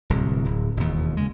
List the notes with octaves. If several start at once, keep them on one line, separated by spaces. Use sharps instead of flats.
D1 C2
D1
E1 D#2
C#3 G#3